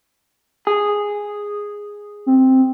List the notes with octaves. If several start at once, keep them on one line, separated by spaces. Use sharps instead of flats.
G#4
C4